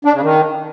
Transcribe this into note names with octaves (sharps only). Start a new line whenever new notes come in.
D4
C#3
D#3